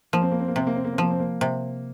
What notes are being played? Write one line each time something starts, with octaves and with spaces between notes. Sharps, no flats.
F3 A#3
C4
A#3
C4
A#3
C3 C4
A#3
C4
A#3
C4
F3 A#3
C4
A#3
C3